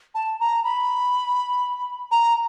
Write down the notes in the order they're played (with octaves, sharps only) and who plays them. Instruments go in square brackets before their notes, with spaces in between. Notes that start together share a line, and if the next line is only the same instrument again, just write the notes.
[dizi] A5
A#5
B5
A#5